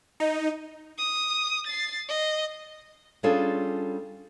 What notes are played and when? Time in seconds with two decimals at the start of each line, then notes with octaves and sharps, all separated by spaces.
0.20 D#4
0.98 D#6
1.67 A6 C7
2.09 D#5
3.23 G3 C#4 D4 F4 G#4 A4